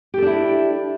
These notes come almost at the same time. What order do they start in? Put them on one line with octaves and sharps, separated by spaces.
G4 A4 D4 E4